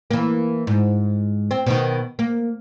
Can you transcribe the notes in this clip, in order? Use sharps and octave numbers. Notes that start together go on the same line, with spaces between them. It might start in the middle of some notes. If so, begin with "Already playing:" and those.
E3 A#3
G#2
C4
B2 D#3
A#3